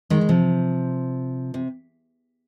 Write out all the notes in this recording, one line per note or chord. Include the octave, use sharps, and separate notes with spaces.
D#3 G#3
D#3
C3 F3
C3